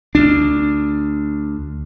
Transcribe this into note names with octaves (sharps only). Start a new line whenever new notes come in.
D2 D4